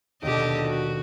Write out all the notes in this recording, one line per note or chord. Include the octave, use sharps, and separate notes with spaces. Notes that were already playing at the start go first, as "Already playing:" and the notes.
D#2 B2 D3 G4 D#5
F#4